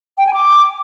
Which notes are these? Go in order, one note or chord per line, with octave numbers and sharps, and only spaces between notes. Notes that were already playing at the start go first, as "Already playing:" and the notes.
G5
G#5
D6